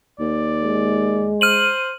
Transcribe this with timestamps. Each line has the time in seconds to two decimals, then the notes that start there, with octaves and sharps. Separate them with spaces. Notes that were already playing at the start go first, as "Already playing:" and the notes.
0.20 D#2 D5
0.61 G#3
1.41 C5 F6 D#7 F#7